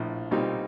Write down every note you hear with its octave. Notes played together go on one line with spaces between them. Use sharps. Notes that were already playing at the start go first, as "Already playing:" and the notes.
Already playing: A#1 A2 F3
B1 A#2 G3 C4 D#4